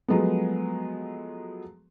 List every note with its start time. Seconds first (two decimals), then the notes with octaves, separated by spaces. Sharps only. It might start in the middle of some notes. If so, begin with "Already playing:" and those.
0.08 F3 F#3 G#3 A3 B3